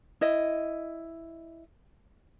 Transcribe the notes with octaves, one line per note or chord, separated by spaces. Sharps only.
E4 D#5